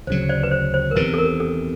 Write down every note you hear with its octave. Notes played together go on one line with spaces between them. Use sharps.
D2 C#3 F#3 C5
C5 D5
B4
C5
C5
A#4
E2 C3 D#3 B4
A4
A#4
A4